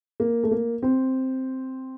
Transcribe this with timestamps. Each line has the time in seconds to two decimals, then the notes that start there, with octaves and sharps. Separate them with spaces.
0.20 A#3
0.44 A3
0.51 A#3
0.83 C4